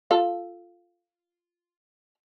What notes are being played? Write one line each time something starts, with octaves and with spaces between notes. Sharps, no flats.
F4 A4 F5